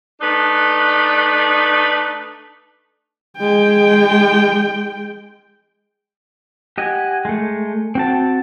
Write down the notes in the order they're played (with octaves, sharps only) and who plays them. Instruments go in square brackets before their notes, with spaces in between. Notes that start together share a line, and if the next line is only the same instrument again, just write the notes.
[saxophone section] A3 D4 D#4 B4
[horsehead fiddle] G#3 G5
[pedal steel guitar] G4 D#5 F#5 G#5
G#3 A3
C4 F#4 A5